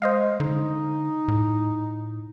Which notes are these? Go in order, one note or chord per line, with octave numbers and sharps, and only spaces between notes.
G#3 C5 D#5 F5
D3 D#4
A2